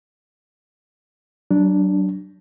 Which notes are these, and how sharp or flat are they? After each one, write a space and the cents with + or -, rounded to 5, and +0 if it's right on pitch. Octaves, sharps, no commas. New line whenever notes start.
F#3 +35 D4 +0